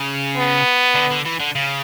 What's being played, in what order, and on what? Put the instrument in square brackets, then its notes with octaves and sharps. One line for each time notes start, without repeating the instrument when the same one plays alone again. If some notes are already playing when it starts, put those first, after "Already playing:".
Already playing: [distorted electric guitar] C#3
[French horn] B3
[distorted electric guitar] D3
D3
E3
D3
C#3